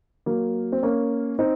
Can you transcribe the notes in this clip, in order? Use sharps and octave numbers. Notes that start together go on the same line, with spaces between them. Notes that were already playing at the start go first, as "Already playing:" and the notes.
F#3 A#3
C4
A#3 C#4
C4 D#4